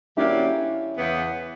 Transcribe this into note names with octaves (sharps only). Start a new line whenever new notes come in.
D3 F#3 A#3 C#4 D4 E4 G4
E2 C#3 E3 B3